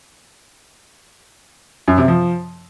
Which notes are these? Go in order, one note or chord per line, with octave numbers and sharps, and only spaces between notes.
F#2
C3
F3